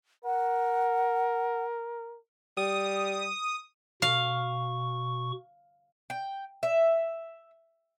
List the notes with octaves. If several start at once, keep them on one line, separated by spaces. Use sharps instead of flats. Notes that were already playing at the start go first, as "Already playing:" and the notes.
A#4 F#5
G3 D#6
B2 F5 C#6
G5
E5